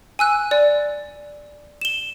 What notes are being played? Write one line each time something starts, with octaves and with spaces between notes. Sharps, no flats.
G#5 E6 F#6
D5
E7 G7